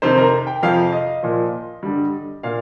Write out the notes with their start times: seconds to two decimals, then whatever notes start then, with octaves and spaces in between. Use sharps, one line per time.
0.02 F2 C3 D#3 C5
0.18 A#4
0.47 G5
0.62 F2 C3 F3 F5
0.92 D#5
1.23 A#2 F3
1.83 G2 D3 G3
2.43 A#2 F5